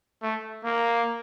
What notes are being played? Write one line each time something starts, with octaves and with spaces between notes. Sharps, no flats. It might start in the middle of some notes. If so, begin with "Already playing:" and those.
A3
A#3